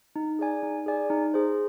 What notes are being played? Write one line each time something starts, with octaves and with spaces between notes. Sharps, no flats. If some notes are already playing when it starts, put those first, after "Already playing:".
D#4
G#4 D5 G#5
D#4
G#4 D5 G#5
D#4
G#4 C5